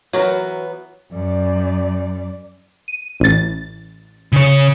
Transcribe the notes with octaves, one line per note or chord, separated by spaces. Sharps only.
E3 F#3 B3 F#4 A#4
F#2 D5
D#7
A1 A6
C#3 C#5